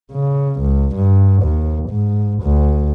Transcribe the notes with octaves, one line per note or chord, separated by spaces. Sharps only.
C#3
C#2
G2
D#2
G#2
D2